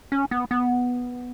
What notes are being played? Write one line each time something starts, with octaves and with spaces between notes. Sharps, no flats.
C#4
B3
B3